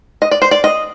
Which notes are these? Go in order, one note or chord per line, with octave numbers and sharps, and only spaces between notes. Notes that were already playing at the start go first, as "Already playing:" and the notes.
D#5
D5
C5
D5
D#5